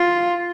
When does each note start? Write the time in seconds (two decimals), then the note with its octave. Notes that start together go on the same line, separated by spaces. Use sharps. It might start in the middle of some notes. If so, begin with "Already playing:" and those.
Already playing: F4